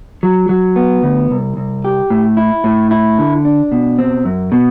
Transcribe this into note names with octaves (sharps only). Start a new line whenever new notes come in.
F#3
F#3
B3
D2
C2
C2
G4
A2
E4
A2
E4
D3
D4
B2
C4
F#2
B2